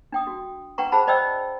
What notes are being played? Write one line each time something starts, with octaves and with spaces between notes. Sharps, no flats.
D4 G5 D#6
F#4
D4 B4 F#5 G5 A#5 C#6
G#4 C5 F#5 A5 B5
C5 D5 D#5 G5 E6